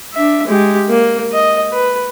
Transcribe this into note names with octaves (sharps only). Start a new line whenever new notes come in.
D4 E5
G#3 G4
A#3
D#5
B4